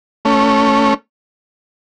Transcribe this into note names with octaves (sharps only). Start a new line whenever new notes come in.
A3 C#4